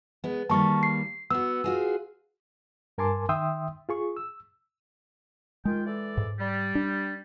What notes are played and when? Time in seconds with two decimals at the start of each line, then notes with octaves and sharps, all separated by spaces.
0.24 G#3 B3
0.50 D#3 G3 A#3 A5 C#6
0.83 C7
1.30 B3 F#4 E6
1.64 F4 F#4 G#4
2.98 G2 A#4 G#5 A5 C6 D6
3.29 D#3 E5 G5 C6 D#6 E6
3.89 F4 G#4 C#6
4.17 E6
5.65 D#3 G#3 F4 G5
5.85 E3 A4 D5
6.17 G#2
6.39 G3
6.75 D4